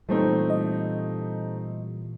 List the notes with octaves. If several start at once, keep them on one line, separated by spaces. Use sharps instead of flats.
A#2 E3 G3 A3 C4 D#4
D#5